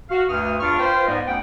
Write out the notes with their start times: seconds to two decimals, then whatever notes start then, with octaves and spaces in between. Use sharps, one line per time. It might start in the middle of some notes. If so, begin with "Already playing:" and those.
0.10 F#4 F5
0.29 D2 G2 D#6 F6
0.60 E2 G2 D4 F4 C#6 F6
0.79 F4 B4 C5 G5
1.07 G#2 G3 B3 D#5
1.26 D2 B3 C#4 F#5 G5